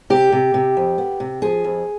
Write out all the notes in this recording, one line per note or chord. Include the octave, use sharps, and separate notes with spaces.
C3 G4
C3
C3
F2
B3
C3
F3 G#4
F2